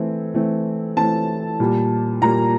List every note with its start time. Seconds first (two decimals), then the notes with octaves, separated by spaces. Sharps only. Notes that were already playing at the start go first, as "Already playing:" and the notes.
Already playing: E3 A3 C4
0.34 E3 A3 C4
0.96 E3 A3 C4 A5
1.59 A#2 G3 A#3
2.22 A#2 G3 A#3 A#5